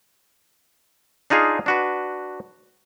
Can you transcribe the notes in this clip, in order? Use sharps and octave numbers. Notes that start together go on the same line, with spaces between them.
D4 D#4 F4 G#4 F5
D4 F#4 B4